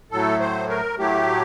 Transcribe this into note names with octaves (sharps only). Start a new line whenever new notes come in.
A2 F#3 A3 A4
C5
A#4
A2 F#3 A3 G4